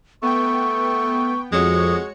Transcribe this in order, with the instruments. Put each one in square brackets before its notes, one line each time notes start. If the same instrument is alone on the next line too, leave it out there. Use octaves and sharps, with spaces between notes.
[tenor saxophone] A3 [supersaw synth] B3 G5 [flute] C#6
[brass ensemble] F2 [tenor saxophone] G#3 [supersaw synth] F#4 C#5 C#7 [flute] D#6